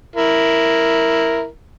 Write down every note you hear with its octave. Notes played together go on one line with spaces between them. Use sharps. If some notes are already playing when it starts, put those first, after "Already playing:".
E4 A#4